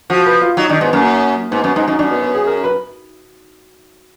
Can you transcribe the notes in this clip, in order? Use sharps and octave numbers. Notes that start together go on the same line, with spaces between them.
F3 F#4
B4
F4
F#3 D#4
D#3 D4
G#2 B3
F#2 A#3
G#2 B3
F#2 B3
G#2 D#4
F#2 D#4
F#2 D4
B3
B3
G#4
A#4
B4